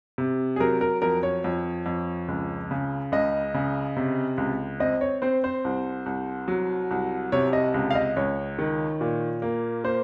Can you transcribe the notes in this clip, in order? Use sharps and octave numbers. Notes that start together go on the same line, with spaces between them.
C3
G#4
F#3 A#4
A#4
F2 A#4
C#5
F2
F2
C#2
C#3
C#2 D#5
C#3
C3
C#2
C4 D#5
C#5
C4 C5
C5
C2
C2
F#3
C2
C3 C#5
D#5
C#2
F5
D#5
C#2 C#5
D#3
A#2
A#3
A#3 C5